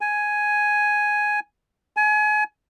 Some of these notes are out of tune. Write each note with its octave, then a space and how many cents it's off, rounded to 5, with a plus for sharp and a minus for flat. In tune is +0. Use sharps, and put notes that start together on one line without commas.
G#5 +5
G#5 +30